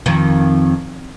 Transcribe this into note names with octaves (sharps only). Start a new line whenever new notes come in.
F2 D#3